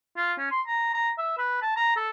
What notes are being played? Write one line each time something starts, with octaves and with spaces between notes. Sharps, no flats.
F4
C#4
C6
A#5
A#5
E5
B4
A5
A#5
A4